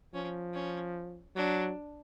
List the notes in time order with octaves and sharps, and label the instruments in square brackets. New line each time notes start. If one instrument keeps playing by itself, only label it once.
[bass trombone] F3 [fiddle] C#4
[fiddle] C#4
[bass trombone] F#3 [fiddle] D4